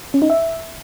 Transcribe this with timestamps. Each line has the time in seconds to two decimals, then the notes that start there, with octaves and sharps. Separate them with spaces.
0.14 C#4
0.22 D#4
0.30 E5